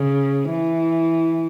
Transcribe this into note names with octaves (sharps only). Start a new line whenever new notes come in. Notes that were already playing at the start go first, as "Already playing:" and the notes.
Already playing: C#3
E3